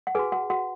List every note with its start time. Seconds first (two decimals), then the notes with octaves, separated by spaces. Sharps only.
0.07 F#5
0.15 F#4 G#4 B4 G#5
0.32 F#4 F#5
0.50 F#4 F#5